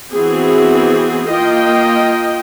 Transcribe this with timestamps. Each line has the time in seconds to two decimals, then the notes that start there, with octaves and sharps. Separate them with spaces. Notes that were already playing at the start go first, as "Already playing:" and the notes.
0.12 E3 B3 C4 F#4 G#4
1.28 A#3 F4 D#5 G5